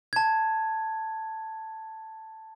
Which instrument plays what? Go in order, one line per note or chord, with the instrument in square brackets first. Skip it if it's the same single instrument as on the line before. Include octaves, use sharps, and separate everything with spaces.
[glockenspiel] A5 G#6